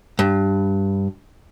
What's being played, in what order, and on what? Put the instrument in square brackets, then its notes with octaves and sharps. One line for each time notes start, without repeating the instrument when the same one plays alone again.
[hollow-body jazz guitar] G2